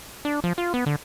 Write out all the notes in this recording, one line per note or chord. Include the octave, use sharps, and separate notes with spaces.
D4
F3
F4
B3
D3